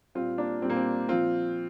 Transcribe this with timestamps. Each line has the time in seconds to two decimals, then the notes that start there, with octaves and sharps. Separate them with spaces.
0.15 A#2 G3 C4 F4
0.38 A#3 D4
0.62 A#2 G3 C4
0.70 A#3
0.76 C4
1.09 A#2 F3 C4 F4